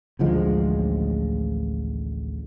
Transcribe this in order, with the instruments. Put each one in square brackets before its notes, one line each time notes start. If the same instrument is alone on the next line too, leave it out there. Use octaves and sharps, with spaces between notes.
[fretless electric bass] A1 D2 F3 G#3